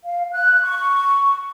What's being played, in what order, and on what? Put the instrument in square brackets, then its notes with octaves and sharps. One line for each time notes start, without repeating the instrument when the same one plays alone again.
[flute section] F5
F#6
C#6